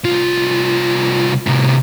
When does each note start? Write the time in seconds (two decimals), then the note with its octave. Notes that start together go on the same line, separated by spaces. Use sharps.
0.04 C2 F4
1.47 A2 C3